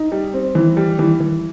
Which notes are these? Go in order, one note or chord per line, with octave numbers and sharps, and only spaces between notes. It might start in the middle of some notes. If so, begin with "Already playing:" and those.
Already playing: D#4
G3
C4
E3
G3
E3
E3